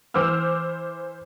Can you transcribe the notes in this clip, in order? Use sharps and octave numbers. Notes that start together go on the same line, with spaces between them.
E3 C5 D6 E6 F6